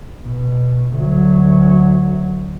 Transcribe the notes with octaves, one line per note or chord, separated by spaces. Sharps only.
B2
D2 F#3